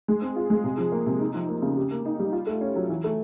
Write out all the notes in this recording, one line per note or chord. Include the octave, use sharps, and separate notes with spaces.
G#3
C4
F4
G#3
C3
F3
A#3
C3
D#4
F3
A#3
C#3
G4
A#3
D#4
G3
F4
A3
C#4
F#3
E3
A3